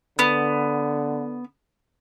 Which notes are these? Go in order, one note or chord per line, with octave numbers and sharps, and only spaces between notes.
D3 B3